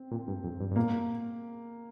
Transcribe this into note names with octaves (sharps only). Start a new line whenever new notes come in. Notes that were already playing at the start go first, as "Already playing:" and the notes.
Already playing: C4
A#2
G2
F2
G2
G2
A#2 A#3